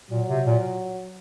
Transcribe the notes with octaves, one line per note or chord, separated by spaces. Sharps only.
A#2 F#3
C3
A#2